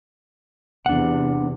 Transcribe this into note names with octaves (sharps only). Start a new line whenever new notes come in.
E2 C3 D4 F#5